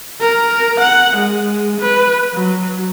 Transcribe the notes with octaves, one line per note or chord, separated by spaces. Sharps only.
A#4
F#5
G#3
B4
F#3